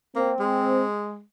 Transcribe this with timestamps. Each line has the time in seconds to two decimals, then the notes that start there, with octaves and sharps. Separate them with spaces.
0.16 A#3 C4
0.40 G#3